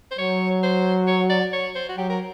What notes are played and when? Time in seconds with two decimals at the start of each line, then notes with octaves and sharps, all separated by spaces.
0.11 C5
0.18 F#3 C#5
0.63 C5
1.08 C#5
1.30 D5
1.53 C#5
1.75 C5
1.89 F#4
1.97 F#3 G4
2.10 A#4